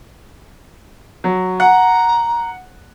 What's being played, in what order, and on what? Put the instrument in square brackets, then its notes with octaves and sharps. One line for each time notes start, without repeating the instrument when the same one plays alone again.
[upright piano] F#3
[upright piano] F#5 [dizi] A#5